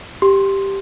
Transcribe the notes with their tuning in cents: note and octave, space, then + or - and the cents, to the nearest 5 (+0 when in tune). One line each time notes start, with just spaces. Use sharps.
G4 +0 C6 +0